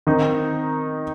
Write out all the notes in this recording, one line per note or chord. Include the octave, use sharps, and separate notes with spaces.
D#3 C4 D#4